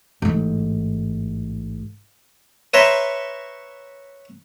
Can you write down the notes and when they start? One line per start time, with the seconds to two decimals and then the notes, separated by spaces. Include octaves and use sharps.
0.22 A1 G#2
2.74 B4 C#5 E5 G5 A#5 C6